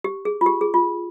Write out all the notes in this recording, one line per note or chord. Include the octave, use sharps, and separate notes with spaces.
G4
G#4
F4
G4
G#4
F4